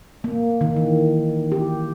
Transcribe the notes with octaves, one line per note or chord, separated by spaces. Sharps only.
A#3
D#3
E3
G4